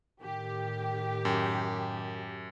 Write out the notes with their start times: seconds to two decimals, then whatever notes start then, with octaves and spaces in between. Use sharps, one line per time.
0.23 A2 D#3 G4
1.25 F#2